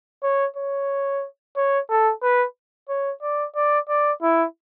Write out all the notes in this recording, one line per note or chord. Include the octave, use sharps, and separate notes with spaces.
C#5
C#5
C#5
A4
B4
C#5
D5
D5
D5
E4